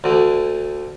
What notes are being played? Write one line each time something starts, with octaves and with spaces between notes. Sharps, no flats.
D2 D3